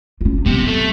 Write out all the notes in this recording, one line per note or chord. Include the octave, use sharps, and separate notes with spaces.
C#4 F4
C3 F#3 B3
A3